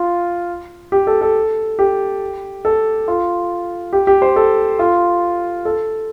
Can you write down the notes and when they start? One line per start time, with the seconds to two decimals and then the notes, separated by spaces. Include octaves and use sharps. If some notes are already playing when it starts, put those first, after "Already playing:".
Already playing: F4
0.92 G4
1.07 A4
1.21 A4
1.79 G4
2.65 A4
3.08 F4
3.93 G4
4.07 G4
4.22 C5
4.36 A4
4.79 F4
5.65 A4